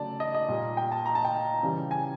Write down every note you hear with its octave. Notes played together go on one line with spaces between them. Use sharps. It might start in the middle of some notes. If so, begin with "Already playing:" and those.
Already playing: C#3 F#3 A3 D5 A5
D#5
D#5
A#2 G3 A#3
G5
A5
A#5
A5
G5
C#3 E3 G3
G#5